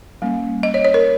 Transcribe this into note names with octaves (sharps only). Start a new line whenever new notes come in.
G3 A#3 C#4
D#5
C#5
C#5
A#4